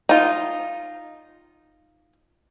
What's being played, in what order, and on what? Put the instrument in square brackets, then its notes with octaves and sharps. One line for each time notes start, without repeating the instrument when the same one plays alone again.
[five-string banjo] D#4 F4